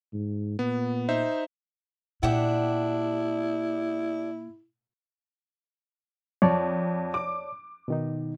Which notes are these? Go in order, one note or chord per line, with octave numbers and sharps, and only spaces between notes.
G#2
A#2 B3
D#4 C5 E5
A#2 D4 E4 G4 F#5
F2 C#5 D5 A5
D6
B2 D#3 D#4